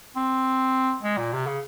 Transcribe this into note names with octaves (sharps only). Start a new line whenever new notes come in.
C4
G#3
A#2
C3
C#3